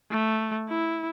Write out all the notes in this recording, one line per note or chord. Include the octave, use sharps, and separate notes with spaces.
A3
E4